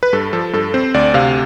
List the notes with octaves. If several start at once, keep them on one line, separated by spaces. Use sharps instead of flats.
B4
G2 A4
F3 A4
G2 A4
C4 C5
D2 D5
C3 F5